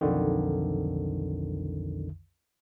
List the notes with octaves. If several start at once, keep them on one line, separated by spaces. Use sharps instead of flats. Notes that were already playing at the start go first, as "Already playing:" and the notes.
B1 F2 D3 D#3